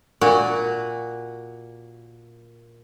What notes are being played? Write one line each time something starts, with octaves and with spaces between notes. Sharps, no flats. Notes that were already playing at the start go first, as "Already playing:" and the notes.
A#2 F#4